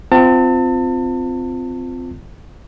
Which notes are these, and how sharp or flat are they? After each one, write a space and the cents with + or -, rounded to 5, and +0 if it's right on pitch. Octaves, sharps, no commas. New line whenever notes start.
C4 -20 F4 +0 A5 +40